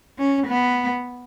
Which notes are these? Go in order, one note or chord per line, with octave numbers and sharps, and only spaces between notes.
C#4
B3